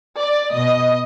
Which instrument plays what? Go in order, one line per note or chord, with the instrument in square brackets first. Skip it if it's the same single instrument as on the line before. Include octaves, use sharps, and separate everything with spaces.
[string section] D5
B2 D#5